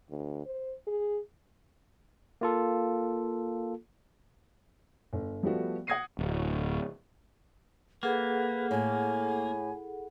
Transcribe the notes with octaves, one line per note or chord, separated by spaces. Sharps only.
D2
C5
G#4
A#3 F4 A4
G1
F3 G3 A3 B3 F#4
F#5 D#6 G#6 A#6 C7 D#7
D1
A#3 G#4 A4 B4 F#5
A2 G#5